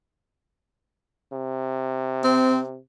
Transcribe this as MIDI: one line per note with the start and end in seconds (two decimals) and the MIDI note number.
1.33 2.77 48
2.24 2.62 60